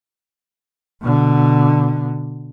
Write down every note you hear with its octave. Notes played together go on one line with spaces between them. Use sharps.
B2 D3